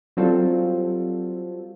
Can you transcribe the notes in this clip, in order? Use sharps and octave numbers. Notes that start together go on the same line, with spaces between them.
F#3 G3 C4 F4 A4